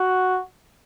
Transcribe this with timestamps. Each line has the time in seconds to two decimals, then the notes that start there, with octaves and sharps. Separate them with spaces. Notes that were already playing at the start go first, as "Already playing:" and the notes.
Already playing: F#4